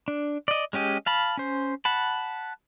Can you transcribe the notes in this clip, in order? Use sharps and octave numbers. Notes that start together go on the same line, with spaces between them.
D4
D5 D#5
G#3 C#4 G4 D#5
F5 A5 B5
C#4 C5
F#5 A5 B5